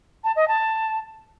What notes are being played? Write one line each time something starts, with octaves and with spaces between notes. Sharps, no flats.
A5
D#5
A5